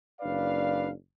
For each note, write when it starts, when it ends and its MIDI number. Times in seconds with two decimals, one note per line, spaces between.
0.21 0.89 30
0.21 0.89 62
0.21 0.89 71
0.21 0.89 74
0.21 0.89 77